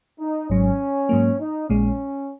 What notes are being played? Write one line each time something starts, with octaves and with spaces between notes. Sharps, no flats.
D#4
G#1 G#2 F#3 C#4
G#2 F#3 A#3
D#4
A#1 A#2 G#3 C#4